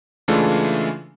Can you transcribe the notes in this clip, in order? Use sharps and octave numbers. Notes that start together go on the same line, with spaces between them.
C#3 E3 G#3 A3 D4 F4